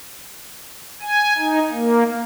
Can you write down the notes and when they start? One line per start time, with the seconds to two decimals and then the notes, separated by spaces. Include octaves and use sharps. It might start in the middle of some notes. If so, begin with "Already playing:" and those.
1.02 G#5
1.38 D#4
1.71 A#3